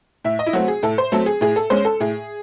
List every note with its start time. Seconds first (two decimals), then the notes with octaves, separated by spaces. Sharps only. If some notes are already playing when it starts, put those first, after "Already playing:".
0.25 A2 E5
0.39 D#5
0.46 E4
0.53 F#3 A3 C4 F#4
0.68 G#4
0.83 A2 A4
0.98 C5
1.12 F#3 A3 C4 A4
1.26 G#4
1.41 A2 G#4
1.56 A4
1.70 G#3 C#4 C5
1.85 A4
2.00 A2 G#4